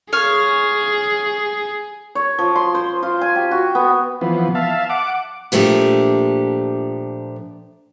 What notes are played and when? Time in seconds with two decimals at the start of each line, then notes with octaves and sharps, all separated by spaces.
0.13 G#4 C#5 F5
2.15 C#5
2.39 F3
2.55 C6
2.75 C5
3.03 F4
3.21 G#5
3.36 G4
3.51 F#4
3.75 B3
4.21 E3 F3 B3
4.55 E5 F5 A5
4.90 F#5 D6
5.52 A#2 F3 A3 D4 G4